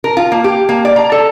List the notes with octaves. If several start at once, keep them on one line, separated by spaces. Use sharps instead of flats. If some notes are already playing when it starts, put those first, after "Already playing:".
A#4
F4
A#3
G4
A#3
D5
A#5
A4